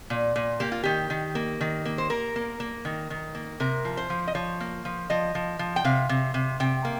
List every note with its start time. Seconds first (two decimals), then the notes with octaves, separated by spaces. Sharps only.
0.10 A#2
0.36 A#2
0.60 A#3 G4
0.72 F4
0.84 D#3 G4
1.10 D#3
1.35 A#3
1.61 D#3
1.85 A#3
1.98 C5
2.10 A#3 A#4
2.36 A#3
2.60 A#3
2.85 D#3
3.10 D#3
3.35 A#3
3.60 C3 A#4
3.85 F3
3.97 C5
4.10 F3
4.27 D#5
4.35 F3 C#5
4.60 A#3
4.85 F3
5.10 F3 D#5
5.35 F3
5.59 F3
5.76 G5
5.85 C3 F5
6.09 C3
6.34 C3
6.60 C3 G5
6.85 A#3